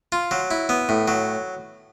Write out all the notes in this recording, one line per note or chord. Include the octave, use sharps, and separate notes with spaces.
F4
F#3
E4
B3
A2
F#3